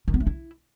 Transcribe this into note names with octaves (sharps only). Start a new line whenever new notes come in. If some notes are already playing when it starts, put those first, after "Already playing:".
D#3
B3
A3
E4